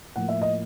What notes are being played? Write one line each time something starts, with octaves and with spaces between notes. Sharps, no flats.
A2 F3 A#3 F#5
E5
D#5